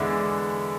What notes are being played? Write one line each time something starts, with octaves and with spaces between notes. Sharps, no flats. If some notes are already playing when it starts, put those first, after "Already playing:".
Already playing: E2 D3 G#3 D4 E5